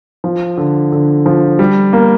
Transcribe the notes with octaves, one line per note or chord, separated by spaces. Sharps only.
F3
D3
D3
F3
G3
A#3